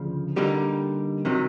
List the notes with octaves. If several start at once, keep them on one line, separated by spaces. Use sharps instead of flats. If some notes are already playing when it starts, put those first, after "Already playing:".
Already playing: D2 C#3 F3
D3 G3 A#3 D#4 G4
C3 D#3 F#3